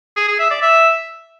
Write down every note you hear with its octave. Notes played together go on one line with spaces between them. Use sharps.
G#4
G#4
E5
D5
E5